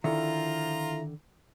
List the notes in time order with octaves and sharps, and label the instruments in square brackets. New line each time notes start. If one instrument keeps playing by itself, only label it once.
[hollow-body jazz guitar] D3 D#3 [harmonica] F3 F4 A#5 [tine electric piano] E4 A4 E5